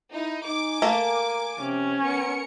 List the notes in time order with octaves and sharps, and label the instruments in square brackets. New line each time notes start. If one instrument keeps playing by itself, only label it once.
[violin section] D#4 [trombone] E4
[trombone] D#4 [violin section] G#5 D6
[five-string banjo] A3 A#3 [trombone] A#4
[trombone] C3 [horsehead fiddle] C#4
[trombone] B3 [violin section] A#4 C#7